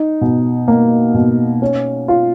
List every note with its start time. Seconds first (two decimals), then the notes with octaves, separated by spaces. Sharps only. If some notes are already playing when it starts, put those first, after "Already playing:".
Already playing: D#4
0.21 B2
0.68 A#3
1.14 B2
1.62 C#4
2.08 F4